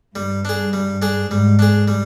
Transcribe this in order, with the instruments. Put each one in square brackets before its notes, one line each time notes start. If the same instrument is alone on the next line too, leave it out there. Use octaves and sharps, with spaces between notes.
[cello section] G2 [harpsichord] G3
[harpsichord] D4 G#4
G3
D4 G#4
[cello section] G#2 [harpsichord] G3
[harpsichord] D4 G#4
G3